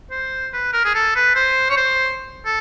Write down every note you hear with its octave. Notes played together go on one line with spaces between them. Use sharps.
C5
B4
A#4
G#4
A4
B4
C5
C#5
C5
A4